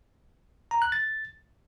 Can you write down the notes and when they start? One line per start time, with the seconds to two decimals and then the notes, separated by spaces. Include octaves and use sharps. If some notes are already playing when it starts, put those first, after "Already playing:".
0.71 A#5
0.82 F#6
0.92 A6